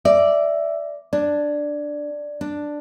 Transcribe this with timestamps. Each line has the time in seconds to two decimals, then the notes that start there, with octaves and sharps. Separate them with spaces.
0.05 D5 E5
1.13 D4 D5
2.41 D4